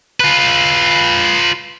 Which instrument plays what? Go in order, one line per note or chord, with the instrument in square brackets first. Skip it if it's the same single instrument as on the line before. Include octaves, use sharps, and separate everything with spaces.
[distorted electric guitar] F4 B4